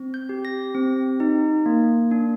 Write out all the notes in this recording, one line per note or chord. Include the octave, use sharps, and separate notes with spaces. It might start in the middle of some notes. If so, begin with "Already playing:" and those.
Already playing: C4
G6
G4
A#6
C4
D#4
A#3
D4